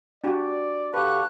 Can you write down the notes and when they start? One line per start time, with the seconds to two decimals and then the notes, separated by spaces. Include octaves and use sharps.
0.24 D4 F#4 G4 D5
0.94 D3 G4 B4 F5 A5 C#6 F#6